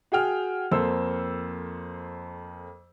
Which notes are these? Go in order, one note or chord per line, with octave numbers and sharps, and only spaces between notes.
F#4 G#4 G5 F6
F2 A#3 A4 C5 E6